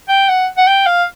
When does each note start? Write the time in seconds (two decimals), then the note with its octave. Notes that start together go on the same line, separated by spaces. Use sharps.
0.09 G5
0.29 F#5
0.58 F#5
0.67 G5
0.87 F5